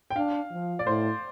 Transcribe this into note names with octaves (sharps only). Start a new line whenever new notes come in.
G5
D4 F5
F3
D5
A2 C5